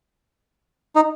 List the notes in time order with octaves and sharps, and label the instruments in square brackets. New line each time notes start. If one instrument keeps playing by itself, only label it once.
[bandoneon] D#4